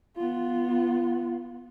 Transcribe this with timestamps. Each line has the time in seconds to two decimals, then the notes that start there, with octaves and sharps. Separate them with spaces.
0.17 B3 F4